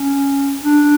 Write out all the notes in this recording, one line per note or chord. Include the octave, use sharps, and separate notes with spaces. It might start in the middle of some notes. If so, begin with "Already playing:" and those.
Already playing: C#4
D4